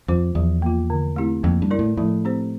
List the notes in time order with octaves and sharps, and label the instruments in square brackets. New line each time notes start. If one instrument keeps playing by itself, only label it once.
[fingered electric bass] F2 [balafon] F4 C5
[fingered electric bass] E2 [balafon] F3
[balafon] A#3 F4
D3
A3 C4 E4 G4
[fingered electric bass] F2 [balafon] A#3
[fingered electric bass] G2
[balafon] E4 A#4 D5
[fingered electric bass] A2
[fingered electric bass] A2 [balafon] F3
[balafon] C4 G4 C5